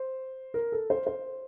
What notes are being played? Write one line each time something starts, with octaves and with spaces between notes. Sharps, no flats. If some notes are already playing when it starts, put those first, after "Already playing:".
Already playing: C5
A#4
A4
C5
C5